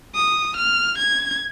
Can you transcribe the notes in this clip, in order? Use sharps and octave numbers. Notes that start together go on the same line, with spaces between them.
D#6
F6
G#6